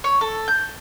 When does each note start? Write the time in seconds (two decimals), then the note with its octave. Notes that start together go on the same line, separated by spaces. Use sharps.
0.04 C#5
0.21 A4
0.48 G6